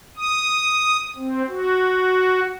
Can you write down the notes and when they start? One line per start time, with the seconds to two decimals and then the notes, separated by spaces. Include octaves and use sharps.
0.17 D#6
1.16 C4
1.49 F#4